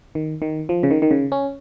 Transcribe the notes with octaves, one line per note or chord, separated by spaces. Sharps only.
D#3
D#3
F3
C#3
D#3
D#3
C#3
C#4